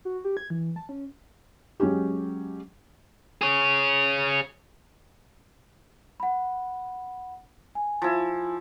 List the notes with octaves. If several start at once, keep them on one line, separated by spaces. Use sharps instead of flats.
F#4
G4
G#6
E3
A5
C#4
F#3 G#3 C#4 G4
G#4 C#5
F#5 B5
G#5
F3 E4